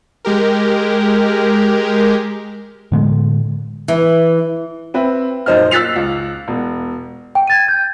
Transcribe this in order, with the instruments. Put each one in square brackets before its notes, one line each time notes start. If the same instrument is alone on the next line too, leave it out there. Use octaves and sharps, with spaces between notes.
[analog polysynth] G#3 G4 A#4
[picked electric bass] A2 D3 G#3
[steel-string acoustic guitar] E3
[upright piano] C4 B4 E5
D#1 F#2 D#4 C5 D#5 F6
E6 F#6 A6 B6 C7 F7
C#2
E1
[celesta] G5
G#6 A6 D#7
G6